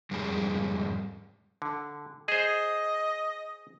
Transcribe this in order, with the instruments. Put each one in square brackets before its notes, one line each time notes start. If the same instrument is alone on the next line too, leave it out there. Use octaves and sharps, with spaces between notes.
[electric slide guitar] F2 G#2 G3 G#3
[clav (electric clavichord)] D3
[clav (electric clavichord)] G#4 C5 [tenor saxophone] D#5